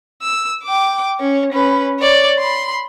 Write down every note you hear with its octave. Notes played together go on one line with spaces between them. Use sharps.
E6
G5 D6
C#4 C#5
C#4 B4
C#5 D5
B5 C6